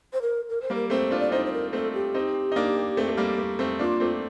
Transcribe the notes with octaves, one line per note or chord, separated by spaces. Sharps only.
C5
A#4
A#4
C5
G3 A#3 A#4
A3 C4 C5
D4 F4
D5
C4 D#4 C5
C5
A#4
A3 C4 A4
G4
C4 D#4
D#4
A#3 D4
A3 C4
A3
G3 A#3
A3
A3 C4
A#3 D4 F4
A3 C4